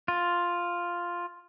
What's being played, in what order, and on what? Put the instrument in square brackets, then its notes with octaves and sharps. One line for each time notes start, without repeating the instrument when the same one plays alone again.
[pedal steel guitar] F4